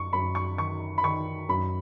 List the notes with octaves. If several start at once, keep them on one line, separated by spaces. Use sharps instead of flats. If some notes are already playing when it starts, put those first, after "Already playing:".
Already playing: F#2 C#6
F#2 B5
C#6
D#3 C#6
B5
D#3 C#6
F#2 B5